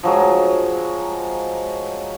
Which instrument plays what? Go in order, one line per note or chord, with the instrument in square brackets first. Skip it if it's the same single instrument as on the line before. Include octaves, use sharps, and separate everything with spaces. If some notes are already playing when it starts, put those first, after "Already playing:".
[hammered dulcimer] F3 F#3 G#3